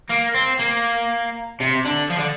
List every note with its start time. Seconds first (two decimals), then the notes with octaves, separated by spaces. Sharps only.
0.09 A#3
0.34 C4
0.59 A#3
1.60 C3
1.85 D3
2.10 F3
2.18 D3